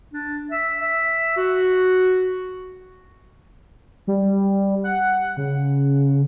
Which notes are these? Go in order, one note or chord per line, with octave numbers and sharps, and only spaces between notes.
D4
E5
E5
F#4
G3
F#5
C#3